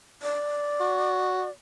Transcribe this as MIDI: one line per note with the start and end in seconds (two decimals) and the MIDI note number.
0.22 1.51 74
0.80 1.44 66